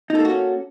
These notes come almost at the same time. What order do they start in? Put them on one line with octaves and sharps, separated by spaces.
D#4 A4 A#3 F#4 C#4